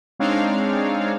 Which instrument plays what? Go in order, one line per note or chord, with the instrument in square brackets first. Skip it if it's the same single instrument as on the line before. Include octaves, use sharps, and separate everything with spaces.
[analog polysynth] G#3 C4 D4 D#4 C#5 F5